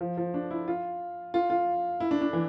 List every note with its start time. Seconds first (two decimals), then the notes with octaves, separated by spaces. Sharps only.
0.01 F3
0.17 F3
0.34 D4
0.51 E4
0.68 F4
1.34 F4
1.50 F4
2.00 E4
2.11 D4
2.22 D4
2.33 E3